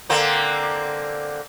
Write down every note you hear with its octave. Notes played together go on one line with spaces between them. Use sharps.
D3 A#3 C4